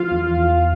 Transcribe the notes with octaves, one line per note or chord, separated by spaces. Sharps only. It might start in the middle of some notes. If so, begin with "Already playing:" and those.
Already playing: F3 F4 F5
E2
E2